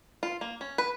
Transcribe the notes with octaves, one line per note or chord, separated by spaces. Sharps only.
F4
A#3
C#4
B4